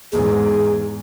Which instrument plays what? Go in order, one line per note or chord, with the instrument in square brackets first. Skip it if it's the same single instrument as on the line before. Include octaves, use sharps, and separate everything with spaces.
[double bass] E2 G#2 [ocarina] G#4